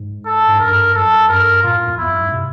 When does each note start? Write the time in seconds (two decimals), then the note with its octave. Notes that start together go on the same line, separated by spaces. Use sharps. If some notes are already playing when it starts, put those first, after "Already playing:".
Already playing: G#2
0.26 A4
0.48 G#2
0.60 G2 A#4
0.94 F#2 A4
1.29 G2 A#4
1.63 A#2 F4
1.75 A2
1.87 F2
1.98 E2 E4
2.09 F#2
2.22 G#2
2.32 C3